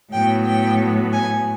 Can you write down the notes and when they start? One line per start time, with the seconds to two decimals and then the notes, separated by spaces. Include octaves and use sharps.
0.11 A2 F#3 B3 G5
0.45 G5
1.12 G#5